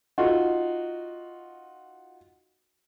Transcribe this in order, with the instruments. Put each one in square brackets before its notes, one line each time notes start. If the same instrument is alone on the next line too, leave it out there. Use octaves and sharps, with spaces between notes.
[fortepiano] D#4 F4 F#4